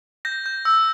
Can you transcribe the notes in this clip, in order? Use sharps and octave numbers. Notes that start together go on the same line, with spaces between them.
G6 A#6
G6
E6